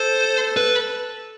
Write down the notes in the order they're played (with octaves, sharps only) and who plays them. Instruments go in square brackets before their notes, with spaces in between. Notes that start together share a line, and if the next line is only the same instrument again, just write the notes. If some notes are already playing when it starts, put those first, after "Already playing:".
Already playing: [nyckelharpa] A4 [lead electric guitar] C5
[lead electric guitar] B4